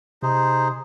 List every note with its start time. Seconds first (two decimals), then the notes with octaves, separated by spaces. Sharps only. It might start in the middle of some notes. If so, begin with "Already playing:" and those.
0.23 C3 D#4 G#4 C5